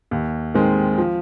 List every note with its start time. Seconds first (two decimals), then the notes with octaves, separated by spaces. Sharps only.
0.11 D#2
0.54 D#3 G#3 C4
0.98 F3